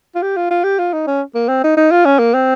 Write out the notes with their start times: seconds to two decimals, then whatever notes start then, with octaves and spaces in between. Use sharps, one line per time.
0.15 F4
0.22 G4
0.37 F4
0.51 F4
0.64 G4
0.79 F4
0.93 D#4
1.07 C#4
1.35 A#3
1.49 C4
1.64 D#4
1.77 D#4
1.91 F4
2.05 C#4
2.19 A#3
2.34 C4